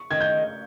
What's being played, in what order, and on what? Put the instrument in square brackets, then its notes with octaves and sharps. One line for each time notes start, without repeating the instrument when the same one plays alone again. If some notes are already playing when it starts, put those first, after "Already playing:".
Already playing: [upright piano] C#6
[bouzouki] D#3 [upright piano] G#6
[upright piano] G6